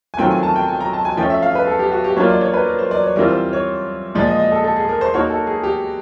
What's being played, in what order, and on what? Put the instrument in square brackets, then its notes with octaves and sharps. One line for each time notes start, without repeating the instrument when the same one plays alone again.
[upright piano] G#5
[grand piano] D#3 F#3 A3 C4 F4 [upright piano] G5
[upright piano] G#5
A5
G5
G#5
A#5
A5
G#5
[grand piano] F3 A3 C#4 [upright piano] G5
[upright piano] E5
F5
B4
A4
G4
F#4
G4
[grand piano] F#3 A#3 D4 F4 [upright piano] C#5
[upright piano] D5
C#5
B4
A#4
C5
D5
C#5
[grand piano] E3 G3 C4 F4 [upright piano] A#4
[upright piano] C5
C#5
[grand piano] A#2 F3 G#3 [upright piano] D5
[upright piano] D#5
D#5
A4
A4
G#4
A#4
C5
[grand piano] A#3 D#4 F#4 A#4 [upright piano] C#5
[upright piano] A4
G#4
G4